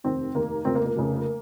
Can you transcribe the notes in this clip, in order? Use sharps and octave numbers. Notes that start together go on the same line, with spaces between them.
F1 D#2 D#3 C4
F1 D#2 D#3 A#3
F1 F2 C#3 C4
A#3
A#3
F1 F2 C#3